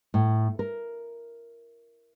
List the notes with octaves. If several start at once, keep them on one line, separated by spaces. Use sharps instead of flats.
A2
A#4